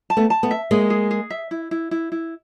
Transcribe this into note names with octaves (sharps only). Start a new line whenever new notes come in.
A5
A3 B3
A5
A3 B3
E5
G#3 A#3 G#4
G#4
G#4
E5
E4
E4
E4
E4